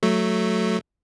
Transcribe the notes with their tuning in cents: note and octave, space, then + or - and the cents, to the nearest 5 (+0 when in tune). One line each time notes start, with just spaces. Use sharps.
F#3 +0 A3 +0